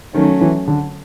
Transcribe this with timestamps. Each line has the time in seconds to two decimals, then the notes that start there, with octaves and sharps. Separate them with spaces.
0.14 D#3 F#3 A3 C#4
0.41 E3
0.68 D3